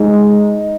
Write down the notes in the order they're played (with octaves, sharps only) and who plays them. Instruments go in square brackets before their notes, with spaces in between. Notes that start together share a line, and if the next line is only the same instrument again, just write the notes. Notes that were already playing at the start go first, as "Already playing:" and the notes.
Already playing: [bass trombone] G#3 [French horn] D#4